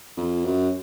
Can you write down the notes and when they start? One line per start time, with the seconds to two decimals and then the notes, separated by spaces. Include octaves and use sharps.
0.17 F2
0.45 F#2